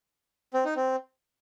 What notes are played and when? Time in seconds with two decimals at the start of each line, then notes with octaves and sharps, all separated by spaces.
0.54 C4
0.65 D#4
0.76 C4